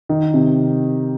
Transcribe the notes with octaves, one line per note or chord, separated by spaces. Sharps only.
D#3
C3